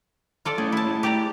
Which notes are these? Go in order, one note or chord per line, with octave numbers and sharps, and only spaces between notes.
F4 A4 D5
A2 A3 C#4 G#4
E4 A5
A2 G#3
G4 D5 A#5